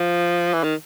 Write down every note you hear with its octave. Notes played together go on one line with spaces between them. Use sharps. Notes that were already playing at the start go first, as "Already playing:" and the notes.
Already playing: F3
E3
D#3